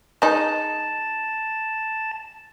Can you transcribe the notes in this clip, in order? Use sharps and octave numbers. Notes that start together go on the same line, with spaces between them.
G#3 D#4 A5